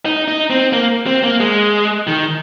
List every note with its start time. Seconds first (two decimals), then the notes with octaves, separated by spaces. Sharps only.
0.05 D#4
0.28 D#4
0.50 C4
0.73 A#3
1.06 C4
1.23 A#3
1.40 G#3
2.07 D#3